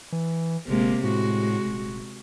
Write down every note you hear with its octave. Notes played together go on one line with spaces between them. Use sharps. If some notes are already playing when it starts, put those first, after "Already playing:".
E3
G1 C3 G#3 A#3
A2 G#3 F#4
D#1